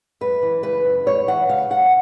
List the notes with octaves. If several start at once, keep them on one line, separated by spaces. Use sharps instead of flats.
F#2 B4
E3
C#3 B4
F#2
F#2 C#5
E3 F#5
C#3 F5
F#2 F#5